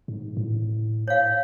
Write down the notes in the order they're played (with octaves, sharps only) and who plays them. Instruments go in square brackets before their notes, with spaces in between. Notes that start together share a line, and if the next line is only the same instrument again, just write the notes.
[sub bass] G#2
A2
[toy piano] C#5 F5